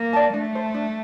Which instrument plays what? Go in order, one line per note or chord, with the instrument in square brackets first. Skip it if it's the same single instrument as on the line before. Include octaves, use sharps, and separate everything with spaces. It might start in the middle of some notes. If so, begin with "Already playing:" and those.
Already playing: [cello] A#3
[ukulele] D5 A5
[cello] A3 [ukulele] D4
[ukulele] A4 C5
D4